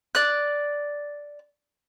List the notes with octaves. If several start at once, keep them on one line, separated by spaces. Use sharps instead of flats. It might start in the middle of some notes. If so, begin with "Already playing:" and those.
D5 F#6